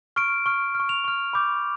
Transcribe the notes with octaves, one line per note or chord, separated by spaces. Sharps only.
C#6 F6 D7
C#6 F6
F6
C#6
F7
C#6 F6
B5 D6 G6